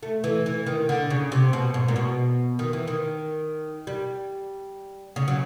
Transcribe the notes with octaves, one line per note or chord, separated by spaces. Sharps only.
A3
E3
E3
D#3
D3
C#3
C3
B2
G#2
A#2
B2
D#3
E3
D#3
G3
C#3
F#3